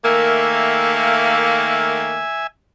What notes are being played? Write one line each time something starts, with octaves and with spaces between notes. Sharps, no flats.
D#3 A3 A#3 E5 G#5